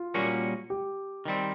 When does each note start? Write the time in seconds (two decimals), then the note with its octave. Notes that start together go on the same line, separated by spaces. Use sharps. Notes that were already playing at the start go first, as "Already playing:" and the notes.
Already playing: F4
0.14 A#2 G3 A#3 C#4 F#4
0.70 G4
1.25 D#3 G3 C4